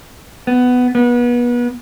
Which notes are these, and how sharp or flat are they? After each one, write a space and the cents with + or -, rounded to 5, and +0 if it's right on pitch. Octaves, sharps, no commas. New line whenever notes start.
B3 +10
B3 -30